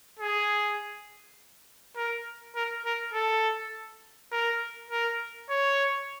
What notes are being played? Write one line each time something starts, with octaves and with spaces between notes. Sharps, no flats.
G#4
A#4
A#4
A#4
A4
A#4
A#4
C#5